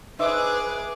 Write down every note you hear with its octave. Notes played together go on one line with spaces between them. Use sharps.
D#4 G#4 B4 C5 E5 D6